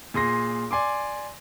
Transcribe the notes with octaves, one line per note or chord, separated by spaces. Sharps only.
A#2 G#4 C6 A#6
D5 G#5 C6 D6